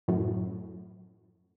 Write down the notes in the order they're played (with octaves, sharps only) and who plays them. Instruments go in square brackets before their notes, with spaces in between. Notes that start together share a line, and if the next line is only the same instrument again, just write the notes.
[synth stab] F#2 A2